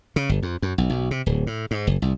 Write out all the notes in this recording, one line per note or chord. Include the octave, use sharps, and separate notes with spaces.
C#3
G1
F2
F#2
B1
B1
C3
D1
A2
G#2
F#1
C2